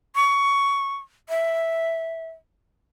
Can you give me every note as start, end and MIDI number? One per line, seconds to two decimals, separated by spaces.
0.16 0.95 85
1.29 2.28 76